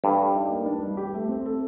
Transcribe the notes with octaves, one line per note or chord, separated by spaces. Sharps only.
G2 A4
D5
D#4
A#3
D4
G3
G4
A3
C4
A4